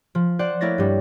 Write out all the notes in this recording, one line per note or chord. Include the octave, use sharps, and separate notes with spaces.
F3
C5 D5 F#5 F#6
A3 A#3 E4 C#5 A6 A#6
G2 G3